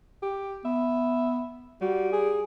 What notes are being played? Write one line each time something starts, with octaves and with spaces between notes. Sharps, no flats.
G4
B3 E5
G3 F#4
G#4